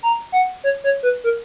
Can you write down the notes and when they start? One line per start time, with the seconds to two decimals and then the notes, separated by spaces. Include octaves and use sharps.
0.03 A#5
0.32 F#5
0.64 C#5
0.84 C#5
1.03 B4
1.24 A#4